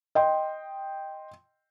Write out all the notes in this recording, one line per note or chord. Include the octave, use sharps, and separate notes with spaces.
D#5 G5 C6